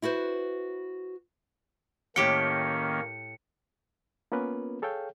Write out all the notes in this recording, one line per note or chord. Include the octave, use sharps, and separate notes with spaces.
E4 F#4 B4 C5
A2 D#3 A#3 C#4 G4 G5 C#7
A#3 B3 C#4 F4 A#4 B4
G#4 A4 C#5 F5 G5